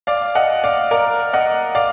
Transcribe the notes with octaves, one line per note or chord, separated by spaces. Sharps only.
D5 F5
D#5 F#5
D5 F5
A#4 D5
D#5 F#5
D5 F5